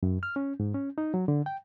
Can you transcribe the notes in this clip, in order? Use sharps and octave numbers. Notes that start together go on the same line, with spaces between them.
F#2
F6
C#4
G#2
C#4
D#4
F#3
D3
G5